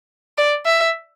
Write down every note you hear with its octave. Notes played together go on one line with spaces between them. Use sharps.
D5
E5